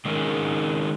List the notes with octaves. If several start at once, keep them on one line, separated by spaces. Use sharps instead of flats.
D#3 G#3 C#4 D#4 G#4 A#4